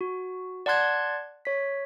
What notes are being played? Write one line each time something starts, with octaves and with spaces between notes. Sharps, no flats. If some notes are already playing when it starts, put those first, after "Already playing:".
F#4
D5 F#5 A5 C6 F#6 G#6
C#5 B6